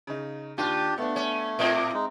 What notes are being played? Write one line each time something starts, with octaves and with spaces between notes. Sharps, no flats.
C#3 D#4
D#2 D#3 D4 F4 G4
A3 B3 D4
C#4
A2 A#3 C4 E5
G#3 D#4